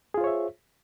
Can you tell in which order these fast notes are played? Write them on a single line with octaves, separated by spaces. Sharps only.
G#4 F4 C5 C#5 E5